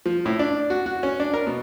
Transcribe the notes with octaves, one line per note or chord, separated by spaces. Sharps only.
F3
A2
D4
F#4
F#4
C#4
D4
A#4
B2